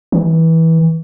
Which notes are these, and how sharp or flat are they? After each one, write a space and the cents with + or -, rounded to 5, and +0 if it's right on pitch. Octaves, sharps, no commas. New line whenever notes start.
E3 -20